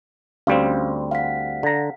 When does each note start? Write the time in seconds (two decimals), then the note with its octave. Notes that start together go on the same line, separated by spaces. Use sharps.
0.47 D2 G3 C4 C#4 F5
1.11 F5 F#5 B6
1.63 D3 A#5